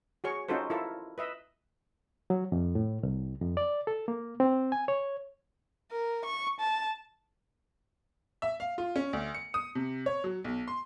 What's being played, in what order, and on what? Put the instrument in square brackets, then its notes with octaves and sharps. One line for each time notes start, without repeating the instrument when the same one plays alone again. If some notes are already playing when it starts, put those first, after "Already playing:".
[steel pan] F#4 G#4 C#5 C#6
C#4 D#4 F4 F#4 A4 C5
E4 F4 A4 A#4
B4 D#5 E5
[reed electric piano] F#3
F2
A2
C2
F2
D5
A4
A#3
C4
G#5
C#5
[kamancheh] A#4
C#6
A5
[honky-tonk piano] E5
F5
F4
C#4
D2
C#7
D#6
C3
C#5
F#3
B1
C6